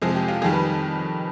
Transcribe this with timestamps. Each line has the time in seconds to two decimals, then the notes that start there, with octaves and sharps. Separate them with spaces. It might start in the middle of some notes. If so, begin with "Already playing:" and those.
0.02 F2 C3 F3 G#3 G#4
0.15 G4
0.28 F4
0.42 F2 D#3 G3 G#4
0.53 B4